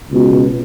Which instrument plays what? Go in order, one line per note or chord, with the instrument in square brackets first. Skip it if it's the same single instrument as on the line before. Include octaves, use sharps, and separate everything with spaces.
[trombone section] C#2 B2